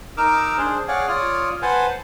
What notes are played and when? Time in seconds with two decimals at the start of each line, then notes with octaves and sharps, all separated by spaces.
0.17 D#4 A#4 D6 E6 F6
0.58 D4 G#4 C5
0.88 G#4 C#5 D5 F5 F#5
1.08 F4 C#5 D5 D#6 F6
1.62 B4 C5 F#5 G#5 A5